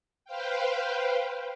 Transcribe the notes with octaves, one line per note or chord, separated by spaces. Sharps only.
B4 C5 F5 G5